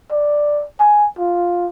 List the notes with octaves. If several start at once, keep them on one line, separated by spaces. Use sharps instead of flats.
D5
G#5
F4